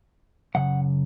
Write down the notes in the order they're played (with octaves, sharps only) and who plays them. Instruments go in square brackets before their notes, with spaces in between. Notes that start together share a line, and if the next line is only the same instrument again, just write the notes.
[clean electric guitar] F#2 C#3 F#5